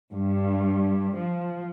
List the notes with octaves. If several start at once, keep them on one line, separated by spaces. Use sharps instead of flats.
G2
F3